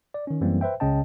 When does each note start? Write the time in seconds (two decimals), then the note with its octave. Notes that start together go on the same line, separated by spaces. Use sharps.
0.14 D5
0.27 D#3 C#4
0.41 F#2 E3 G3 A#3 C4
0.61 B4 C5 E5 G5
0.80 C#2 C#3 C#4 D#5 G5 A5